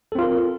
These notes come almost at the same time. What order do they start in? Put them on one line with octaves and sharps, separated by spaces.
A4 C4 F4 A#4